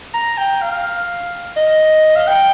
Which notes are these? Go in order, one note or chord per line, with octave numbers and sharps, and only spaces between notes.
A#5
G5
F5
D#5
F5
G5